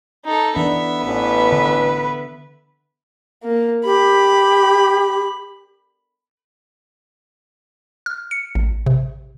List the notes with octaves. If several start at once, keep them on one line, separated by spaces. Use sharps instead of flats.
D#4 A4
E3 B3 D4 E5
A1 B4
D3
A#3
G4 B5
F6
C#7
A1
C3